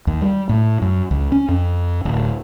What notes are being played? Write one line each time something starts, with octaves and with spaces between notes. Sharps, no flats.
D#2
G3
A2
F#2
C#2
C#4
F2
D1